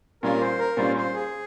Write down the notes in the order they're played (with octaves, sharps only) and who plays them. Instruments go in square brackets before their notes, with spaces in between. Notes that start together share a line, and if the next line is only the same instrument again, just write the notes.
[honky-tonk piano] A#2 G3 C#4 F4 [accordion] A#4
[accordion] C5
A#4
[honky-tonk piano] A#2 G3 C#4 F4 [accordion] C5
[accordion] C5
G#4